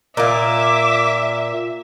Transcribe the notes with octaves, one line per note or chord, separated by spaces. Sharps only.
A#2 A#3 E5 D6